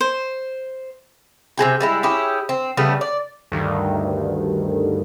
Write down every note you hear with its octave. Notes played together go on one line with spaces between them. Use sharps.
C5
C3 C4 G#4 G5
G3 G#3 E4
C#4 E4 G4 G#4
C4
C#3 G3 A3 B3
D5
D2 G2 D#3